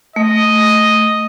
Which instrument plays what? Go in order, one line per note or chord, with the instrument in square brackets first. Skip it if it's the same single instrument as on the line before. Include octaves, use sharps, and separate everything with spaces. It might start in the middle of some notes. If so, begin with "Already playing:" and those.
[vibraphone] A3 [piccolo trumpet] D#5